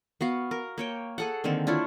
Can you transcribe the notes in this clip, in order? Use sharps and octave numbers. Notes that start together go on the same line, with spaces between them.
B3 F#4 F5
A#4
A#3 C#5 G5
G#4 A4 F#5
D3 D#3 A#3 C4
D4 E4 F4 C#5